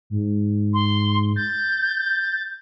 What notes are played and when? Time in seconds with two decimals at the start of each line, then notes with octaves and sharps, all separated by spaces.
0.10 G#2
0.74 C6
1.36 G6 A6